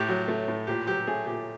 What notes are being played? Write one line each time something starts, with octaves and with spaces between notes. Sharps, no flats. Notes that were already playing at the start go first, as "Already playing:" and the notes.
Already playing: A2 G4
F#3
A3
A2
A#2 G4
F#3 G4
A3 G#4
A#2 G4